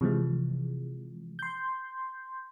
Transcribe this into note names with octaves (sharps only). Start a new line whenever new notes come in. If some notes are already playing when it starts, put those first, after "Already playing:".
C3 E3 F3 G#3
C6 G6